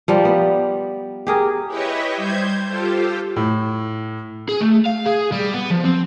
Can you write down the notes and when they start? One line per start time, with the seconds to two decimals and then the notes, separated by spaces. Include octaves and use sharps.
0.08 F3 G3 A#3
0.25 B3
1.27 G4 G#4 A#4
1.66 E4 G4 B4 C#5 D#5 E5
2.17 G3 C5 G6 G#6
2.66 F4 G4 A4 C5
3.36 A2
4.49 G#4
4.61 A3
4.85 F5
5.06 G#4
5.32 G3
5.53 B3
5.70 F3
5.84 C4